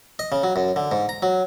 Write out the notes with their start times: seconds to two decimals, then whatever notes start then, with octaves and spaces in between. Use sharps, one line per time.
0.19 D#5
0.32 C#3
0.43 F#3
0.56 F#2
0.76 D3
0.91 G#2
1.09 A#5
1.23 F#3